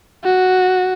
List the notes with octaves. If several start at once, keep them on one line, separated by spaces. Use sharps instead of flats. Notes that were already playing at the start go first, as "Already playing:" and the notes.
F#4